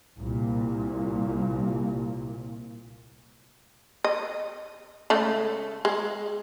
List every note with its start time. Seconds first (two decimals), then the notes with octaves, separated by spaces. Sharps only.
0.17 C2 A#2
4.04 D#5
5.10 C#3 G#3 A3
5.85 G#3